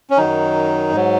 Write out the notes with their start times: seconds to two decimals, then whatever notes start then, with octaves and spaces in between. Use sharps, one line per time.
0.10 C#4
0.18 F#2 D#3 F#3 D#4
0.93 G#2 F#3